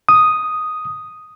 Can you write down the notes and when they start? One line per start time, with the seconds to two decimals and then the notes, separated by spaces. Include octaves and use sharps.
0.09 D#6